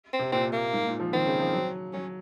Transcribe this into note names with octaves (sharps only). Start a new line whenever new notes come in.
C4
C3
A#2 C4
A#3
G#2
A#2
F3
D#3 C4
C#3
F3
F#3
F#3 C#4